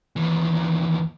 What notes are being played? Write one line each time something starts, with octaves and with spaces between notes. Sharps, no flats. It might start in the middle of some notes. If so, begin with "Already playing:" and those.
D#2 E3